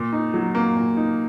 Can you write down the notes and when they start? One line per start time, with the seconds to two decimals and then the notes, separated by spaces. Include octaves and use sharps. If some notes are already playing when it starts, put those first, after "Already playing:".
Already playing: A#2
0.12 D#4
0.34 F#3
0.55 A#3
0.75 A#2
0.97 D#4